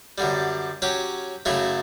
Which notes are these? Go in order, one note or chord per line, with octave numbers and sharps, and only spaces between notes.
F#2 D3 G3
F#3 C#4 G4
F#2 C#3 F#3 A3 E4